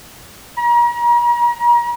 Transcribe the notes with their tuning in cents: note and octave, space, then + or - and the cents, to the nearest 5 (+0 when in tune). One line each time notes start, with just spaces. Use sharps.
A#5 +40